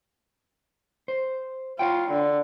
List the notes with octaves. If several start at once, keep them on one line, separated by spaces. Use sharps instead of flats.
C5
F4 C#5 F#5 G5
D3